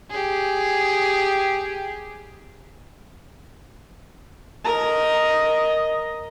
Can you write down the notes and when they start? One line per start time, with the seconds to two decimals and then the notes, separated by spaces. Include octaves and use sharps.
0.10 G4 G#4
4.65 A#4 D#5 A#5